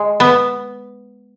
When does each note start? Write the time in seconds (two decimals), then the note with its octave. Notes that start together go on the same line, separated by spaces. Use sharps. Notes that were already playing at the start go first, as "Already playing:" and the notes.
Already playing: G#3
0.20 B3